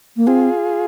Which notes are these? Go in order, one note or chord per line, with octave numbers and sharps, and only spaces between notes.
A#3
C4 F4 G#4